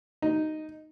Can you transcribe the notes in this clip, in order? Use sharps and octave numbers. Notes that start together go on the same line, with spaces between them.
D#4